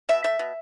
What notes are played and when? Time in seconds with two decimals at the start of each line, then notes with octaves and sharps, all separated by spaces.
0.09 B2 E5
0.24 A3 E5
0.39 B2